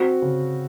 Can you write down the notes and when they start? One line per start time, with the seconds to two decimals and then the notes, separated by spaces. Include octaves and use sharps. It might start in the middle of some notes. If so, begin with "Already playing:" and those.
Already playing: C4 F#4
0.22 C#3